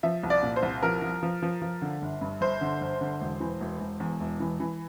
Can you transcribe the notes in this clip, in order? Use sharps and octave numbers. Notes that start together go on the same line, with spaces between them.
F3 E5
C2
D5
A#2
C5
C2
F3 A#4
F3
F3
F3
F3
D3
G1
G2
G1 C5
D3
G1
D3
E1
E3
E1
E1
E2
E1
E3
E3